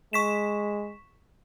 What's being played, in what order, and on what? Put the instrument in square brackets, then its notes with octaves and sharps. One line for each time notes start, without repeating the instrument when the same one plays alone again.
[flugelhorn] G#3 [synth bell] C#6 B6 E7